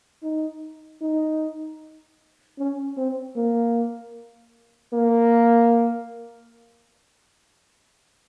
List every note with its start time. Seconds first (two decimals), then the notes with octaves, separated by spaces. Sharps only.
0.23 D#4
1.01 D#4
2.58 C#4
2.97 C4
3.36 A#3
4.93 A#3